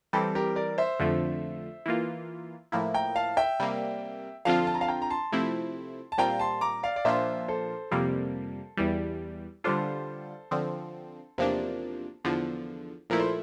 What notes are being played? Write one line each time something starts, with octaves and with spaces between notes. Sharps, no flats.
E3 G3 C4 A4
G4 A#4
A#4 D5
C5 E5
F2 D3 F3 A3
E3 A#3 F4
A2 F3 A#3 E4
G5 A#5
F5 A5
E5 G5
C3 G3 A#3
F2 D3 F3 C4 F4 F5 A5
A5
A#5
F5 A5
G5 A#5
A#5
A5 C6
C3 F3 A3 C4 E4
A5
A#2 G3 C4 F4 G5 A#5
A5 C6
A#5 D6
D5 F5
D5
A#2 F3 A#3 D4 F4 C5 E5
A4 C5
F2 C3 G3 A#3
E2 E3 G3
D3 G3 D4 F4 A4 C5
D3 F3 C4
E2 C3 F3 A#3 D4
E2 D3 F3
A#2 F3 A3 E4 A#4
C5